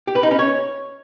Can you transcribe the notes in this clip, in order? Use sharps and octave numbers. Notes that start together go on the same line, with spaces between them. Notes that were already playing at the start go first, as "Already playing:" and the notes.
G4
B4
D#4
C#4
C#5